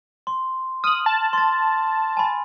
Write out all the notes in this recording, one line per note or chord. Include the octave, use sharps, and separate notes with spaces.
C6
D#6 F6 F#7
A5
C6 A6
G#5 B5